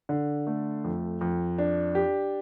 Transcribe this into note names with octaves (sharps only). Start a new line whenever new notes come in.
D3
A3
F2
F2
D4
G4